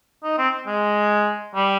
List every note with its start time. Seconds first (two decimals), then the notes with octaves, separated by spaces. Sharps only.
0.24 D#4
0.38 C4
0.67 G#3
1.55 G3